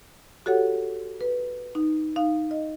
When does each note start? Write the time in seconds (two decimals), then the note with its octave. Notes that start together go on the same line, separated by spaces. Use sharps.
0.46 F#4 G4 A4 C#5 F#5
1.21 B4
1.75 D#4
2.16 D#4 F5
2.51 D#5